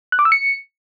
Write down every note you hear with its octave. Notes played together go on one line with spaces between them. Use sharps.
F#6
D6
E6
C#7